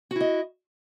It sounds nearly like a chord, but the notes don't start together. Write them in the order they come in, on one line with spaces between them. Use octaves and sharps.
F#4 E4 D#5